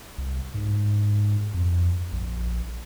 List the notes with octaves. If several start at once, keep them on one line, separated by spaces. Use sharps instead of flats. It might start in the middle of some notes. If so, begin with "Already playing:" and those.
C2
G#2
F2
A#1